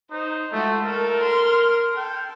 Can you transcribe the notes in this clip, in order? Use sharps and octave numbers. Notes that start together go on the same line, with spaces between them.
D#4 C5
G#3 A3 F4 F#4
A4 A#4
C6 F6
A4 G5